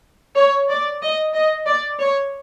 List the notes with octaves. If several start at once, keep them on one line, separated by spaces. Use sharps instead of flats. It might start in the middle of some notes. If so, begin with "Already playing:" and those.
C#5
D5
D#5
D#5
D5
C#5